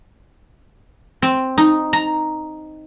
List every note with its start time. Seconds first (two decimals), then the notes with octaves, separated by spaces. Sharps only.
1.22 C4
1.58 D#4
1.93 A#5